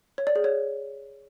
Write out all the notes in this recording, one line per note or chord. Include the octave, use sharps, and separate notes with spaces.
C#5
D5
G#4
C#5